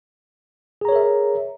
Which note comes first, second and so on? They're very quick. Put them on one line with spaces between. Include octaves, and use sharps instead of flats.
G#4 A#5 C#5 A#4 E5